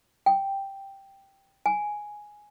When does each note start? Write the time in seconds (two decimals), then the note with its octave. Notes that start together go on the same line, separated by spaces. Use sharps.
0.26 G5
1.66 G#5